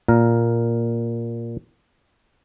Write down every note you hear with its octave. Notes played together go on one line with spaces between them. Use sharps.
A#2 A#4